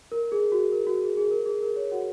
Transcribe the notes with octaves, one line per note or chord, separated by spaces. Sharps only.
A#4
G#4
F#4
A#4
F#4
G#4
G#4
A#4
G#4
A#4
C#5
F#4 F#5